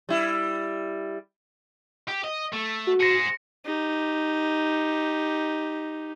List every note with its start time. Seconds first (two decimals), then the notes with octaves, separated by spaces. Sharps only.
0.09 G3 E4
2.08 G4
2.24 D#5
2.54 A3
2.87 F#4
3.01 G#4 C5 A#6 C#7
3.65 D#4 G4